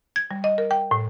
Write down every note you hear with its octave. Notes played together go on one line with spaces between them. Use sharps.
G#6
G3
D#5
A#4
G5
A2